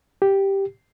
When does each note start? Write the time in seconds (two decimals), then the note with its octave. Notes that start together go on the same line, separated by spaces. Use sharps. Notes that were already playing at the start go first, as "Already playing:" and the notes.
0.22 G4